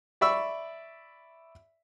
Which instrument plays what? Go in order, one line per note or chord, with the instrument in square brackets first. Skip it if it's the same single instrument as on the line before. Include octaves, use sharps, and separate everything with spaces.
[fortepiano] D5 E5 B5 C#6 E6